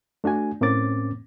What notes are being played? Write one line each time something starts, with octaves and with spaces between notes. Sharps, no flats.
A3 D4 F#4 G#5
A2 A#3 C4 C#4 D6 A6